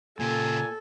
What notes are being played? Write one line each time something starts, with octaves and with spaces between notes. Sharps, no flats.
A#2 C#3 G4 A4 G#5